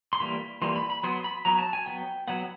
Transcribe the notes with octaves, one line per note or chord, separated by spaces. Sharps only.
C6
E3 G3 A#3 B5
E3 G3 A#3 C6
B5
B5
F#3 B3 C6
B5
F#3 B3 A#5
A5
G#5
F#3 B3 G5
F#3 B3 F#5